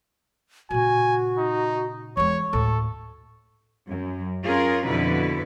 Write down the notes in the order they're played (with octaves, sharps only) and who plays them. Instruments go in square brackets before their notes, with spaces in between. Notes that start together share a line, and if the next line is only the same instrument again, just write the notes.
[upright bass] A#2 C#3 [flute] F#4 [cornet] G#5
[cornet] D#4
[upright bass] E2 G#3 [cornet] C#5 [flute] C#6
[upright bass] D2 A2 [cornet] A4
[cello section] F#2
C#4 F4 G#4 A#4
F2 B2 D3 E4 B4